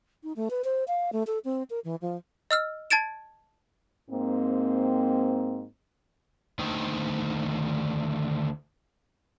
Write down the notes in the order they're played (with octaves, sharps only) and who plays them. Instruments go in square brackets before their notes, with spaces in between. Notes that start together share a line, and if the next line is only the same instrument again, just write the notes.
[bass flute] D#4
A3
B4
C5
F5
A3
A4
C4
A#4
E3
F3
[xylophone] D#5 E6 F6
A5 G#6 A6 D7 E7
[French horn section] G#2 A#3 C4
[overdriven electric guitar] D2 D#3